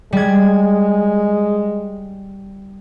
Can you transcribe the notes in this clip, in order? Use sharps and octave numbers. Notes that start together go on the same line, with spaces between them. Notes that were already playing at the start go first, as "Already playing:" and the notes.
G3 G#3 G#6